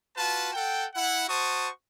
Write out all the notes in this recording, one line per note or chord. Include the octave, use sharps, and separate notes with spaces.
F4 F#4 B4 A5
A4 F#5 G5
E4 F#5
F#4 C5 A5 C#6 D#6